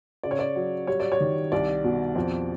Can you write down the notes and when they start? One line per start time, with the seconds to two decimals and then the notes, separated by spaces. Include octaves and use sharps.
0.23 C#3 D5
0.31 C#5
0.39 D5
0.56 F#3
0.87 G3 C#5
1.00 D5
1.12 C#5
1.20 D#3
1.52 C2 D5
1.84 B2
2.15 F2